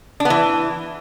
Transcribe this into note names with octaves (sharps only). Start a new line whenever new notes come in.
D4
B3
E3